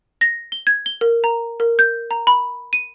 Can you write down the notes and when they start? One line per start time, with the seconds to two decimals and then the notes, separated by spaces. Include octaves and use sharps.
0.21 A#6
0.52 G7
0.67 G#6
0.86 G7
1.01 A#4
1.24 A#5
1.60 A#4
1.79 G6
2.11 A#5
2.27 B5
2.73 D#7